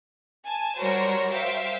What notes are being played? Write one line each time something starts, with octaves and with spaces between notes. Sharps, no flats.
G#5 A5
G3 F#4 A#4 C5 C#5
C5 E5 F5 G5